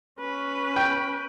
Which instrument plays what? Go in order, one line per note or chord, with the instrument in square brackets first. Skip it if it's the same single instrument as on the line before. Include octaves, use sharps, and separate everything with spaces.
[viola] C#4 B4
[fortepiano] G5